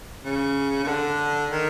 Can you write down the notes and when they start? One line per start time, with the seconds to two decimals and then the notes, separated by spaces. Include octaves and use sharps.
0.24 C#3
0.84 C#3
0.88 D3
1.51 D#3